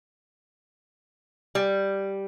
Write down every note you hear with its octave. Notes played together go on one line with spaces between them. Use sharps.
G3